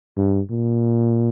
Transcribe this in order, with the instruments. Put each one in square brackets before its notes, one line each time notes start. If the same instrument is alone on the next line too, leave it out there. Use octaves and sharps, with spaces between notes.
[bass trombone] G2
A#2